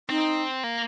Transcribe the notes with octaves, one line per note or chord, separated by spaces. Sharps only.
C4 D#4
A#3